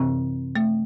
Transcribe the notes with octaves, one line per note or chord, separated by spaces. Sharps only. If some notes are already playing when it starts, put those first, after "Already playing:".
Already playing: F#2 C3 E3 C4
A3